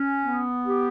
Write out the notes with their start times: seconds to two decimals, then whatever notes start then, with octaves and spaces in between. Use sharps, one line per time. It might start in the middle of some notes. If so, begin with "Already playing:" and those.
Already playing: C#4
0.25 B3
0.65 G4